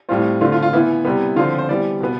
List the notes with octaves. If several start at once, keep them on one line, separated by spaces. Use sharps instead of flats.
A2 G3 C4 F4
D3 A3 C4 F4
F4
F4
E3 B3 E4
C3 G3 B3
D3 F3 C4 F4
C5
E3 G3 B3 D5
B2 B3